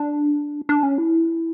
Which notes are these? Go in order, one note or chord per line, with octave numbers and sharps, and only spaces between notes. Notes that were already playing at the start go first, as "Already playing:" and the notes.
Already playing: D4
D4
C#4
E4